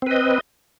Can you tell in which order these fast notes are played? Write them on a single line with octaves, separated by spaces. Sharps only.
C4 B4 D#5